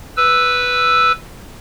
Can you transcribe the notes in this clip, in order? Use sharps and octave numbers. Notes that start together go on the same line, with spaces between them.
B4 E6